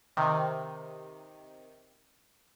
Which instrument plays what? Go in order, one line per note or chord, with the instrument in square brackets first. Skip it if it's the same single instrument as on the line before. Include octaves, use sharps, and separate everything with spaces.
[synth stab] C3 D#3